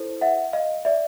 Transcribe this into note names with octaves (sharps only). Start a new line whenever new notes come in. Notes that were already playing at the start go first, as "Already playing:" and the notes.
Already playing: E4 A4 C5
E5 F#5
D#5 F5
D5 E5